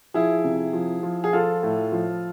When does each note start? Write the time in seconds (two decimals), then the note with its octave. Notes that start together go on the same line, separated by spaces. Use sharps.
0.14 F3 E4 G#4
0.44 C3
0.73 F3
1.03 F3
1.24 G#4
1.33 F3 F4 A4
1.63 A2
1.92 F3